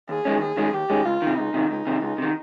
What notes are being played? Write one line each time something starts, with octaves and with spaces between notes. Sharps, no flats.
D#2 G#4
D#3 G#3 C#4
D#2 G#4
D#3 G#3 C#4
D#2 G4
D#3 G#3 C#4
C#2 F4
C3 D#3
C#2 D#4
C3 D#3
C#2 D#4
C3 D#3
C#2
C3 D#3